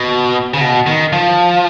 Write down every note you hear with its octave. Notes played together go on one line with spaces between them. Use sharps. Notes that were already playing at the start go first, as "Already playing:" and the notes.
Already playing: B2
C#3
B2
D#3
F3